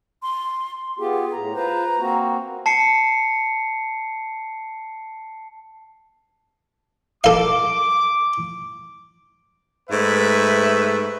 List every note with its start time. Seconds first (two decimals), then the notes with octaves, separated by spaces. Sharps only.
0.23 C6
0.99 B3 F4 G4 G#4
1.33 A2 A#5
1.55 F4 B4 C5 A#5
1.99 A#3 C4 F#4
2.66 A5 C7 C#7
7.24 A4 F5 D6
9.89 G#2 A3 B4 E5